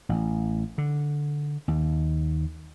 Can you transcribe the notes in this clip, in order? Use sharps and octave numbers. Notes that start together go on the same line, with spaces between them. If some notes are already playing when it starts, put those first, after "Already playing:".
A1
D3
D#2